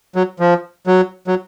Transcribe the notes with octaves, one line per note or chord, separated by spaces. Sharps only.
F#3
F3
F#3
F#3